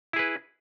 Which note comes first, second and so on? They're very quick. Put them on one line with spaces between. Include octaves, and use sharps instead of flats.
E4 G#4 B4